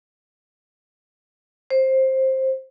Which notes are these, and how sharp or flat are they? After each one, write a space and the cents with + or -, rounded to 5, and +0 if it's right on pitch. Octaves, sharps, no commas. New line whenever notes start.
C5 +15